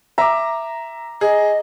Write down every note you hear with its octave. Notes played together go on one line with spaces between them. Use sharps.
E5 A#5 D6
G#4 D#5